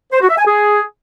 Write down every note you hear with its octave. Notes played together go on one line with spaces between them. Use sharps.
C5
F#4
E5
G#5
G#4